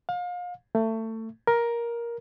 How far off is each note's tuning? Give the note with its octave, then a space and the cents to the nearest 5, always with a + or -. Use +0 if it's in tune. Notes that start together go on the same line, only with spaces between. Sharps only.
F5 +35
A3 +25
A#4 +10